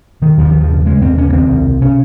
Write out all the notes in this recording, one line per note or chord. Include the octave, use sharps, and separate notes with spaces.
D#2 D#3
D#2 F3
D#3
D#2
F3
C#3
C#3 G#3
D#2 C4
C#3 C#4
A#3
D#2 C4
C2
C3
C3 C#4